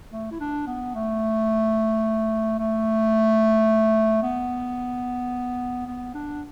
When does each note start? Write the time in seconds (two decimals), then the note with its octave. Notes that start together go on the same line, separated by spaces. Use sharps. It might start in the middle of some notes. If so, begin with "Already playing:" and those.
0.13 A3
0.31 E4
0.40 D4
0.67 B3
0.95 A3
2.59 A3
4.23 B3
5.87 B3
6.14 D4